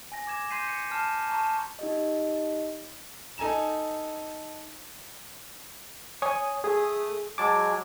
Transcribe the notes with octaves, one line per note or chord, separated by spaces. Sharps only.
G#5 A#6
D6 G#6 E7
C6 G6 B6 C7 D#7
C#7
A5 F6 C7 E7
A5 A#5 C#6
D#4 G4 D#5
D#4 A4 G#5 A#5 E7
C#5 G#5 D#6
A3 G#4 D#6
F#3 G#3 G#5 A5 D6